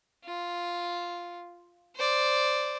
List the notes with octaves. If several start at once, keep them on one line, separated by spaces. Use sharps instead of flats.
F4
C5 D5